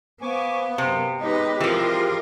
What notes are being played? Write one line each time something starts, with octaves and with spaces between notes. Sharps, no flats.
B3 C5 F5 G#5 C#6 D6
F#2 C3
G#3 B3 D#4 G4 B4 C#5 D#5
E3 F3 C4 F4 A#4 C6 E6